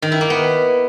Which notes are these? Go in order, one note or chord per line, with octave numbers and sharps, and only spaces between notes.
D#3
E4
A#3
B3